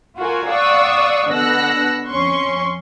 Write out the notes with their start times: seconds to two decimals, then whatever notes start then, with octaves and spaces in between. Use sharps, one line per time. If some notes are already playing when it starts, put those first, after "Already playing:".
0.18 F4 F#4 A#4 G#5
0.48 D5 F5 F#5 C#6 D#6 E6
1.28 B2 D3 F#5 E6 F#6 A#6
2.08 F2 C#4 C6 C#6